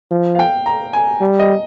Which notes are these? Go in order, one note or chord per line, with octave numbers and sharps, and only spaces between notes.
F3
F5
G5
A#5
G#5
G3
D#5